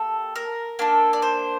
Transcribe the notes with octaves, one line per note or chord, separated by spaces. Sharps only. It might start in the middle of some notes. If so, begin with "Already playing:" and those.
Already playing: A#3 G4 A4
A#4
A#3 D4 A4
D5
C5